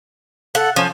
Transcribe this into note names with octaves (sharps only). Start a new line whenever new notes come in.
A4 F#5
F3 C#4